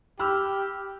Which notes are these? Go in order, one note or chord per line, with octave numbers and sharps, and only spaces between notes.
G4 B5 E6 F6